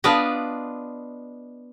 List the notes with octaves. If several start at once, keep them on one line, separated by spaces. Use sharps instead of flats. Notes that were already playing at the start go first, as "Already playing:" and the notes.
B3 D4 F4 B4 D5 D#5